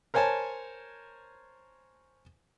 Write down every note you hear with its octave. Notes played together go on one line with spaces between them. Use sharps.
A#4 C5 C#5 G#5 A5